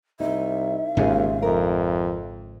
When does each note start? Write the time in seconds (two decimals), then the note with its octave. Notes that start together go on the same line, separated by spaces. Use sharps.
0.20 C2 D#4 E5
0.97 G#1 D#2 G#2 C#3 C#4 F4 G#4
1.42 F2 A#4